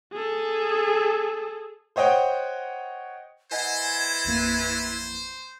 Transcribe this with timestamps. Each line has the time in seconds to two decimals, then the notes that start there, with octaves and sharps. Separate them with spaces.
0.12 G#4 A4
1.96 C5 C#5 D#5 F#5 G5
3.52 E3 C5 D#5 F#5 G#5 G#6
4.25 A1 F2 A#3